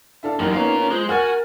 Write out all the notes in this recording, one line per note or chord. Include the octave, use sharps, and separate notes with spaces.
D4 E4 A4 F5
A1 F#2 D#4 G4 A#4
A#3 B3 C#4 F4 A#4
C#4
G#3 F4 C5
F#4 A#4 F#5 G#5 F6 A6